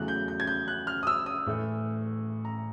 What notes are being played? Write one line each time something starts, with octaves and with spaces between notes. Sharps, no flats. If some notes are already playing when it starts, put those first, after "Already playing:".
Already playing: E2 C#3 F#3 A3 F#6
G6
G6
G#6
G6
F#6
F6
D#6
E6
D#6
A2 E3 A3
A#5